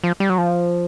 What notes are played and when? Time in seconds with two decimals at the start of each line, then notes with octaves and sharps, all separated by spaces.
0.04 F3
0.20 G3
0.30 F#3
0.38 F3